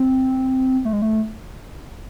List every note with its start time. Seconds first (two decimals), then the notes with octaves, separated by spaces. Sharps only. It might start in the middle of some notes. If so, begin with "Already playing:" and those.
Already playing: C4
0.85 A3
0.93 G#3
1.02 A3